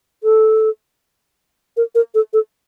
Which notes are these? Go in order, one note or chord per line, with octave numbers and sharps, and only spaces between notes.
A4
A#4
A#4
A4
A4